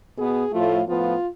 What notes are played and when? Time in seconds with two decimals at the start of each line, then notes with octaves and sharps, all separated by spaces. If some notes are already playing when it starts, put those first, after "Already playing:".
0.16 B2 B3 G#4
0.52 A2 F3 A3 F4
0.87 A2 F3 B3 F4